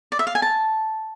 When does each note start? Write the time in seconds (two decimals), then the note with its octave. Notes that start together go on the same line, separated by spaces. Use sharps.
0.12 D5
0.19 E5
0.27 F5
0.35 G#5
0.42 A5